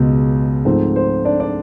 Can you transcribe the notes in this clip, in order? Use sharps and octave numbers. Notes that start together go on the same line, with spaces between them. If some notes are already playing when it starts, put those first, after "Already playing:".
Already playing: C#2 B2 G#3
G#2 F3 A3 C4 C5
C5
D4 D5
D4 D5